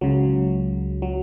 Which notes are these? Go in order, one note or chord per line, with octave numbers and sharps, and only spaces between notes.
C#2 C#3 F#3
F#3